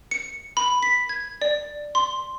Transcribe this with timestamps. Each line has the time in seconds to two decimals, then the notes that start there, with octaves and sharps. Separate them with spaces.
0.11 C#7
0.57 B5
0.83 B6
1.09 G#6
1.42 D5
1.95 C6